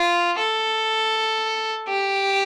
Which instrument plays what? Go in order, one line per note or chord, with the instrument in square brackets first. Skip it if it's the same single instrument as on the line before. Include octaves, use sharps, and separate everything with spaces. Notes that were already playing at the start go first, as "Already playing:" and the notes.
Already playing: [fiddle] F4
A4
G4